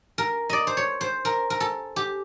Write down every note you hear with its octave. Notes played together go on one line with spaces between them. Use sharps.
A#4
D5 D#5
C5
C#5
C5
A#4
A#4
A4
G4